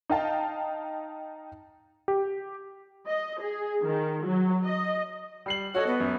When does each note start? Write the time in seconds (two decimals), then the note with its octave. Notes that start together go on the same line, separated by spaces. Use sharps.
0.10 D#4 D#5 F5 G5 A5 A#5
2.08 G4
3.06 D#5
3.40 G#4
3.82 D#3
4.24 F#3
4.64 D#5
5.46 G3 C7 F#7
5.74 F#4 A4 C#5 D#5
5.87 B3
6.00 F#2